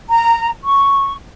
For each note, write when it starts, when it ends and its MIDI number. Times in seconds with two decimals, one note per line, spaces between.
0.09 0.49 82
0.64 1.14 85